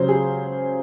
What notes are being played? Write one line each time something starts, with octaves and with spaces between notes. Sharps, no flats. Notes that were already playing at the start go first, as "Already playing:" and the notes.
Already playing: C#3 F#3 C5
G#4